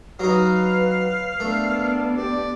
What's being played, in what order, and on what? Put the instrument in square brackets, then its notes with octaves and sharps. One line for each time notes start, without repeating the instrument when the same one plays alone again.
[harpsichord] F#3 D#4 [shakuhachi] B4 [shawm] F5
[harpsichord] A3 [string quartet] B3 D4 [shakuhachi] A#4
[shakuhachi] G4 [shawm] D5